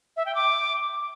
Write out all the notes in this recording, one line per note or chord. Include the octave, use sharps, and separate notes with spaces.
E5
G5
D6